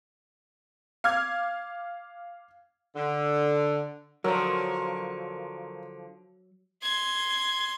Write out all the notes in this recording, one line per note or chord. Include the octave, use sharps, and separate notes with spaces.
F5 D6 F6 G#6
D3
D3 F3 F#3 A#4 C#5 E6
C6 G#6